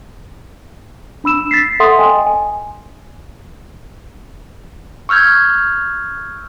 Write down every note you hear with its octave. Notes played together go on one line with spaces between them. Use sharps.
D4 B5 E6 E7
A6 B6 C7
A4 E5 F#5 C6 D#6
D#5 G5 G#5
G#5
C#6 E6 F6 G6 G#6